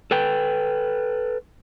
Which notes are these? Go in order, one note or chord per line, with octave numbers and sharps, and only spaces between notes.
A4 B4 G5